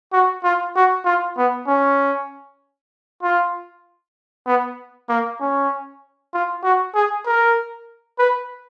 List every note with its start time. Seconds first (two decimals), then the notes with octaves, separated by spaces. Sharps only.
0.13 F#4
0.44 F4
0.75 F#4
1.05 F4
1.37 B3
1.67 C#4
3.23 F4
4.47 B3
5.09 A#3
5.40 C#4
6.34 F4
6.64 F#4
6.95 G#4
7.26 A#4
8.19 B4